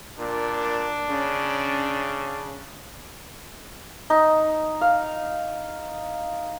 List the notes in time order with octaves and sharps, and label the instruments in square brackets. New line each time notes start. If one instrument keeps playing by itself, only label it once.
[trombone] A#2 [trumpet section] D4 [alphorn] A#4
[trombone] C#3 [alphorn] C#4
[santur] D#4
F5